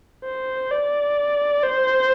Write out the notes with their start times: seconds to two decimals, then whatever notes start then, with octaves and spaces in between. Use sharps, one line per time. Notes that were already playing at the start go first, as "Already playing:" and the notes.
0.24 C5
0.71 D5
1.63 C5